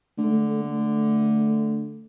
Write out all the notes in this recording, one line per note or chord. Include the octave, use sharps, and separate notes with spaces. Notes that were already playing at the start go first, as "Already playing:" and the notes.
D3 A3
A3